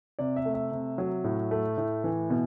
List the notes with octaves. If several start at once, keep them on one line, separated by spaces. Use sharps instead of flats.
C3 D5
E5
A3
E5
C3
F#3
A2
A3
A2
E3
B2